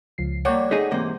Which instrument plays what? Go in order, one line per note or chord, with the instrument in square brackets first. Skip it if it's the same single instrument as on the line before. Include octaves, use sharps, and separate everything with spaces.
[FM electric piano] C#2 F3 C7
[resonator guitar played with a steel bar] G3 A#3 [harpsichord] C#5 [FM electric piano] F#5
[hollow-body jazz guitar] A3 D#4 G#4 [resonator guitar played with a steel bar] D#5
[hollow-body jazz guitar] E2 G#2 C3 [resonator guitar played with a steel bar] A#3 C5